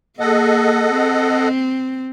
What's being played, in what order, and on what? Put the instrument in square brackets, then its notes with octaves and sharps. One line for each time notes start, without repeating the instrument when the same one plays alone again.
[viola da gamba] A#3 G#4 [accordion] A4 D#5 F#5
[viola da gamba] C4